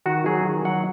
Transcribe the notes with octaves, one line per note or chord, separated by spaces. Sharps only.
D#3 F#4
F#3 G#4
D#3
F#3 F#5